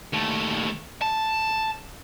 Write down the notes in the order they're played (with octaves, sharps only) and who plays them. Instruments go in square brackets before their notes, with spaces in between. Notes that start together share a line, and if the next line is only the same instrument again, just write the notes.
[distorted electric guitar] D#2 A3
A5